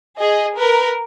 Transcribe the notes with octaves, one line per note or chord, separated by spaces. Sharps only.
G#4 D#5
A#4 B4